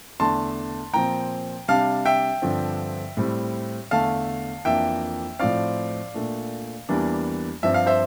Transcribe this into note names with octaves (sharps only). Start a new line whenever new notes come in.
E2 D3 A3 D4 A5 C6
A#2 F3 C4 G5 A#5
C3 G3 D4 F5 A5
E5 G5
G2 D3 F3 C4
A2 G3 C4
E2 D3 A3 F5 A5
F2 E3 A#3 D4 E5 G5
A2 F3 C4 D5 F5
A#2 A3 D4
E2 E3 G3 A#3 D4
G2 F3 C4 E5
F5
C5 E5